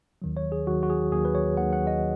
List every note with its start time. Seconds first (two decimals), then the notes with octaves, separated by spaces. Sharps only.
0.22 D#2 D#3 F#3
0.37 C#5
0.52 G#4
0.67 D#2 D#3 F#3 F#4
0.83 F#4
0.90 G#4
1.12 D#2 D#3 F#3 G#4
1.25 B4
1.35 C#5
1.57 D#2 D#3 F#3 F#5
1.73 F#5
1.87 D#5